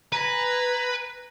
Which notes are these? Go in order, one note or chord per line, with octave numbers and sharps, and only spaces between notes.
B4 G#5 A#5